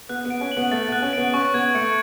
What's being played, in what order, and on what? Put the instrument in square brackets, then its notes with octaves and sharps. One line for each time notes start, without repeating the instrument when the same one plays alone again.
[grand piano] B3 [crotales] F#6
[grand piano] B3
[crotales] D7
[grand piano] C#4
[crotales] F#7
[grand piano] B3
[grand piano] A3 [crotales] A6
[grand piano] B3 [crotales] F#6
[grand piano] C#4
[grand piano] B3 [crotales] D7
[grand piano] C#4 [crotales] C#6
[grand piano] B3 [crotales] G#6
[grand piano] A3 [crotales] C#7